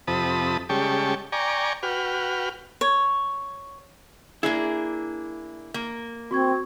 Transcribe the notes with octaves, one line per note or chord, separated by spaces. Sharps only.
F2 C3 A5 B5 D#6
C#3 G3 G#3 G5 A5 C#6
D5 G5 G#5 A#5 C#6
F#4 B4 G5 F6
C#5
A#3 D4 E4 G#4
A#3
C4 F#4 C#6 G#6